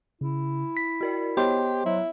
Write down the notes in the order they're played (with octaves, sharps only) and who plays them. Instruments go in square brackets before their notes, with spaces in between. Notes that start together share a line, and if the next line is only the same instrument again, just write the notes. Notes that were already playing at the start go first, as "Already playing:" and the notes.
[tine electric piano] C#3 [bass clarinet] E4
[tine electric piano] B6
[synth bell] F#4 A#4 D5
[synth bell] B3 C#5 [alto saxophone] G4 [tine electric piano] C5 D#5 C6
[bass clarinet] F#3 [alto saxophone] E4